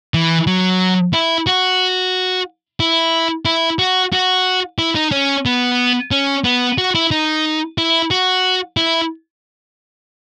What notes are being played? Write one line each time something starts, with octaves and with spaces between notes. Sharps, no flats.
E3
F#3
E4
F#4
E4
E4
F#4
F#4
E4
D#4
C#4
B3
C#4
B3
F#4
E4
D#4
E4
F#4
E4